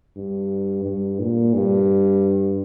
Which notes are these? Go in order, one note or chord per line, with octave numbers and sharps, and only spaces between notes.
G2
G2
A#2
G2